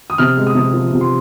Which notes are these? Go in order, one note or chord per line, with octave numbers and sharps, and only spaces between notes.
D#6
C3 F6
G#3
D#6
C3
F3
C3
C6